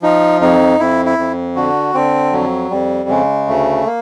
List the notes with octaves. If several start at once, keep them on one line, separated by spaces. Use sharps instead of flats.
F3 D#4
F2 D#4
F2 E4
E4
F2
D3 F#4
D3 C4
F2 F#3
F2 G3
C#3 G#3
D2 A3
A#3